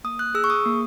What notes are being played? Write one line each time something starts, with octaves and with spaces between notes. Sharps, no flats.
A#3 D#6
F#6
G#4 E6
C#6
D#6
A#3